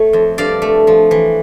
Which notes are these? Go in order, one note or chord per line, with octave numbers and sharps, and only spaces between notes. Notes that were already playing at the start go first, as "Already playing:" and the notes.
Already playing: A3 C#5
F2
G2 D5 F5
A3
F3
E3